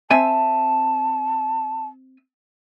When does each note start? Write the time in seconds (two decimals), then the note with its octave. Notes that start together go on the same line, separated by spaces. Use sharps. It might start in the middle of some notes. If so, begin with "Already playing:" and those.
0.11 C4 E5 G#5 A5